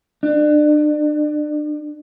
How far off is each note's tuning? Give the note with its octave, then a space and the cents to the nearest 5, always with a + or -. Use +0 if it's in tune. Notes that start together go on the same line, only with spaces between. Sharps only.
D4 +35